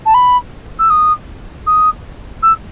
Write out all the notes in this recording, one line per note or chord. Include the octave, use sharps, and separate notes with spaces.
A5
B5
E6
D#6
D#6
E6